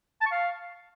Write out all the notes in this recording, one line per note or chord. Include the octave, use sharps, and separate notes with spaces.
A5
C#6
F5